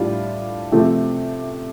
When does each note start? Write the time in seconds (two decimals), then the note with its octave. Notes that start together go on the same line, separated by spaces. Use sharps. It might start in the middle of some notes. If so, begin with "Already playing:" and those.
Already playing: A2 G3 D4 F4
0.71 C3 F3 A3 C4 G4